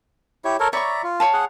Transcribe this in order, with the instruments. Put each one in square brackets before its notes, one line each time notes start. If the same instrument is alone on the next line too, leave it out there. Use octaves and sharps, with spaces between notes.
[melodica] E4 G4 C#5
A4 A#4 C#5
[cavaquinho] C#5 B5 C#6 [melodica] D5 E5 A#5
[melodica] F4
[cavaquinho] C#5 F5 A5
[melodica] G#4 F#5